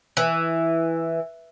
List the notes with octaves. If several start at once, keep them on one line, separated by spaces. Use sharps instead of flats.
E3